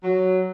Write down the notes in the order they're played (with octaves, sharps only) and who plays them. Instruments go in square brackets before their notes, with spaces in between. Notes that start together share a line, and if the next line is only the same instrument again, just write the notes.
[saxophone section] F#3